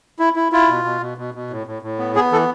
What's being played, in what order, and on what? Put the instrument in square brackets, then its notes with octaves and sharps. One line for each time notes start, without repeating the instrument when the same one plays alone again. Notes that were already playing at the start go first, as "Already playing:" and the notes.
[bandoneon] E4
E4
E4 F4
B2
B2
B2
B2
B2
A2
A2
A2
B3
B3 G#4
E3 A4